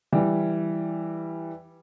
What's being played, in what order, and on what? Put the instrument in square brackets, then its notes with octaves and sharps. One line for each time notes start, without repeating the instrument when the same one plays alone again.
[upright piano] E3 G3